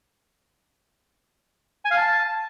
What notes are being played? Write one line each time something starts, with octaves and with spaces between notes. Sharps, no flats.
G#5
F5
A5